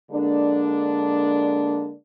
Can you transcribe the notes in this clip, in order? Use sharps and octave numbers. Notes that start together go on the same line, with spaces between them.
D3 G#3 A#3 D4